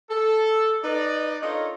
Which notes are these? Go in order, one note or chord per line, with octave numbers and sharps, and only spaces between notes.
A4
D#4 B4 D5
D4 D#4 F4 A4 A#4 C#5